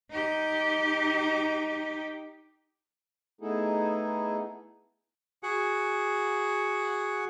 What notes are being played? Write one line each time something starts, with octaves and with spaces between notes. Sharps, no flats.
D#4 G4
A3 B3 D#4 E4 G#4 A4
F#4 G#4 F#5